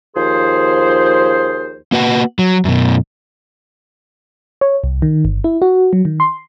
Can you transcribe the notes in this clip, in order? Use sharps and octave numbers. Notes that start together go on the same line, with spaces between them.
D#2 F3 G#4 C5
A#3 F#4 B4 F#5
F#3
F#2 B2
C#5
C2
D#3
G1
E4
F#4
F#3
D#3
C6